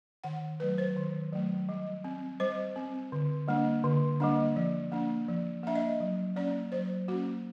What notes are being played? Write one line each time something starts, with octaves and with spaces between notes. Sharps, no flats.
D#3 F#5
F#3 A3 B4
C5
D#3
F#3 A3
G3
C4
G3 C5
C4
D3
G3 A#3 D4
D3
G3 A#3 D4
F3
A#3 D4
F3
A#3 D4 E5
D#5
F#3
A#3 C#4 D5
F#3 C5
A#3 C#4 F#4